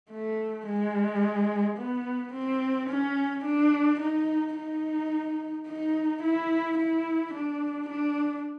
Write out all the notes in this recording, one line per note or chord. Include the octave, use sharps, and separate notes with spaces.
A3
G#3
B3
C4
C#4
D4
D#4
D#4
D#4
E4
E4
D4
D4